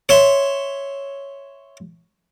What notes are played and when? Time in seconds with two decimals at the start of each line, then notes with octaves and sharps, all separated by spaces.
0.09 C#5 E5 C6